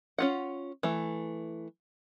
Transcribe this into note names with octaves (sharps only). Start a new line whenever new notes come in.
C#4 F4 F#5
E3 A3